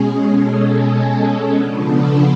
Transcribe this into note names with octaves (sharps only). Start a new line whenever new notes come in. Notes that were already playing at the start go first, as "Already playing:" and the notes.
Already playing: B2 G#3 C#4 G#4
A4
C#3 F3 B3 D4 B4
A4